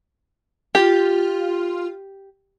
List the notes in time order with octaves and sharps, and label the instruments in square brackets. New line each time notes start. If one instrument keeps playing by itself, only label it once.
[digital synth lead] F4 [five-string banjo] G4